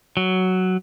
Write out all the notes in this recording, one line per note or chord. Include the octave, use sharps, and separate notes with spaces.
F#3